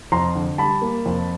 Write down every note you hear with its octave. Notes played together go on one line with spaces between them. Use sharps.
F2 A#5 C6
D3
G3 A5 B5
A#3
F2